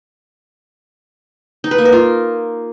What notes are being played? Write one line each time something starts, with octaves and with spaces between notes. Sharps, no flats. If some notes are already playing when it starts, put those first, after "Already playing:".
D#4
B4
A#3
A#4
F4